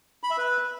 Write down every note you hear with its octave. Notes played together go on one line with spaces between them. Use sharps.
B5
E5
B4